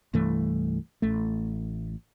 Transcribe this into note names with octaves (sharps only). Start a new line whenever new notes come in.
C2 G2 E3 A3
A1 A3